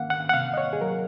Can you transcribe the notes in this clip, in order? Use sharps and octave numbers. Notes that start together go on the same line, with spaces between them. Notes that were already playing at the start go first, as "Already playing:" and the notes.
Already playing: D#3 A#3 F5 F#5
F#5
F#5
C3 F5
D#5
C#5
G#4
F#3 A#4